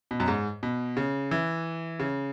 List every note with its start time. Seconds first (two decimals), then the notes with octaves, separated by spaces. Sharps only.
0.11 B2
0.20 F#2
0.28 G#2
0.63 B2
0.97 C#3
1.31 E3
2.00 C#3